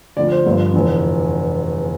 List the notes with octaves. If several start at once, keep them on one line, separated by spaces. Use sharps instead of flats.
D2 D3 F3 D5
C5
G1 G2 D3 F3
F1 E2 D3